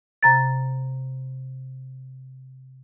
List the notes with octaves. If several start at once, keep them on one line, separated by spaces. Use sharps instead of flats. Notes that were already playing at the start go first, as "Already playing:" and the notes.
C3 A#5 A6